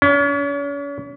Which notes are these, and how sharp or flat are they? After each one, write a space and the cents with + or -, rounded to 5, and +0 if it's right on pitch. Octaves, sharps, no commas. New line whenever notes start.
C#4 +40